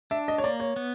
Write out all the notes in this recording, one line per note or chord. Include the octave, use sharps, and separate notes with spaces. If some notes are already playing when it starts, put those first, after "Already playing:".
D4 E5
D#5
C#5
A#3 D5
C#5
B3